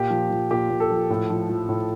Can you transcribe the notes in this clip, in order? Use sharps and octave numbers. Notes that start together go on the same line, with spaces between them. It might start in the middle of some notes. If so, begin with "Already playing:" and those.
Already playing: A#2 G4
F3
F3
A#2 G4
A#2
A4
F3
A2
F3
F3
A2